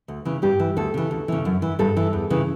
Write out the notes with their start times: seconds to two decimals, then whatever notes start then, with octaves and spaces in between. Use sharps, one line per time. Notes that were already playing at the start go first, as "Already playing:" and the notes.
0.08 D2
0.25 C#3 E3
0.42 G2 G4
0.59 E3
0.76 D2 A4
0.94 C#3 E3
1.11 D2
1.28 C#3 E3
1.45 F#2
1.62 E3
1.79 G2 A4
1.97 E3
2.13 E2
2.30 C#3 E3